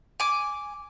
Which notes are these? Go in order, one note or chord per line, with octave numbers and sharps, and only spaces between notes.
G#5 D6